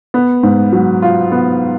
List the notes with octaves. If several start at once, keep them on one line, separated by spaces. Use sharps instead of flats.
B3
G#2
F#3
F4
B3